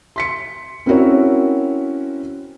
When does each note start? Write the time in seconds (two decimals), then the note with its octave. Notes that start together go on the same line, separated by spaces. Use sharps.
0.16 C6 B6 C#7
0.86 C4 C#4 E4 F#4 A#4 C#5